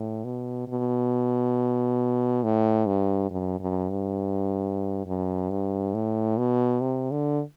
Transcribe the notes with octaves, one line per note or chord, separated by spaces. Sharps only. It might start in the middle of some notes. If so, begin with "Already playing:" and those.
Already playing: A2
B2
B2
A2
G2
F#2
F#2
G2
F#2
G2
A2
B2
C3
D3